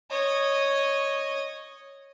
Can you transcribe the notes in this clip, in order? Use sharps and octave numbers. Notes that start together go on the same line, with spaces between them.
C#5 D#5